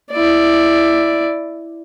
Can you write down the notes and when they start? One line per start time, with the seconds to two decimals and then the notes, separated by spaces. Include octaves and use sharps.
0.12 E4 D5